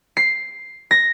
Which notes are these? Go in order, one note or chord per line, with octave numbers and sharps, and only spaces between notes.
C7
A#6